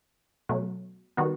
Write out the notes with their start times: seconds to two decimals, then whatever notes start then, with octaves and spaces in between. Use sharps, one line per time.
0.49 B2 F#3 A3
1.17 D#3 G3 B3 F#4